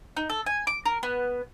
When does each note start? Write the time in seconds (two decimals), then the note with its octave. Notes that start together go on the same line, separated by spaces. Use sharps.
0.17 D#4
0.29 A4
0.46 G#5
0.67 D6
0.85 A#4
1.03 B3